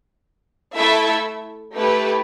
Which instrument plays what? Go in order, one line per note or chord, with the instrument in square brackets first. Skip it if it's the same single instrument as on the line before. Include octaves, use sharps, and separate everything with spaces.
[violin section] A3 E4 A4 E5
A3 E4 G4 B4